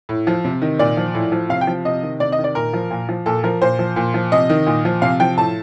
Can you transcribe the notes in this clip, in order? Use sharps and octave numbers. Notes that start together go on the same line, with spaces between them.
A2
F3
C3
D#3
A#2 D5
F3
A2
F3
C3 F5
G5
F3
C3 D#5
D#3
C3 D5
D#5
D#3
D5
A#2 A#4
F3
A#2
F3
A#2 A4
F3 A#4
A#2 C5
F3
A#2
F3
C3 D#5
D#3
A#2
F3
C3 F5
F3 G5
A2 A5